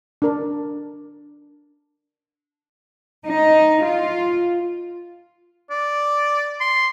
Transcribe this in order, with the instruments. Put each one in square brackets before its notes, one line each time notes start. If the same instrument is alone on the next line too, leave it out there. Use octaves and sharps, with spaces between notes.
[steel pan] D4 A#4
[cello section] D#4
F4
[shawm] D5
C6